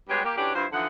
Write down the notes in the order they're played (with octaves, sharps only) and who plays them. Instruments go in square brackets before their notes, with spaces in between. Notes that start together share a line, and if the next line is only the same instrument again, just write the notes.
[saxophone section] G3 G#3 B3 F#4 G4 C#5
A#3 G4
E3 C#4 D4 F#4 G4
G2 E4 F4 C5
D3 E3 F3 D#4 F#5